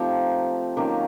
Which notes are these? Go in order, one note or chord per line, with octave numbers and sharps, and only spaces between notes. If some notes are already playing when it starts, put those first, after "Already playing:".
Already playing: F3 A3 C4 D#4 G4
D#3 F#3 A#3 C#4 G4